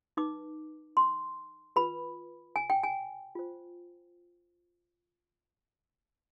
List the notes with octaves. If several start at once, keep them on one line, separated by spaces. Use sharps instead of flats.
D#4 B4 D6
C6
F4 B4 B5
G#5
G5
G#5
F4 C5